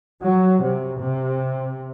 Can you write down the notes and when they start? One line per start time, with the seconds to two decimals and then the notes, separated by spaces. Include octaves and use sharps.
0.23 F#3
0.63 C3
1.02 C3